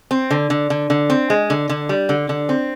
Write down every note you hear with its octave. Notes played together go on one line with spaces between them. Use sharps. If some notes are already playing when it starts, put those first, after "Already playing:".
C4
D3
D3
D3
D3
C4
G#3
D3
D3
G3
D3
D3
C4